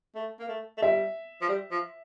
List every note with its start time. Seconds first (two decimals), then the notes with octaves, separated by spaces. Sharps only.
0.15 A3
0.40 A#3
0.48 A3
0.77 A3
0.82 G3 E5
1.41 F3
1.49 G3
1.71 F3